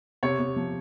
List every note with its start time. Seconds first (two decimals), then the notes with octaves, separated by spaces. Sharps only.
0.23 C3 C#5
0.39 C3
0.56 F3